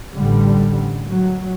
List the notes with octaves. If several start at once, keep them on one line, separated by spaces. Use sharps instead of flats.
A1 D3 G3
F#3